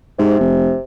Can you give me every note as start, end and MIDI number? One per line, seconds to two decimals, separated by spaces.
0.19 0.38 44
0.19 0.83 48
0.40 0.74 29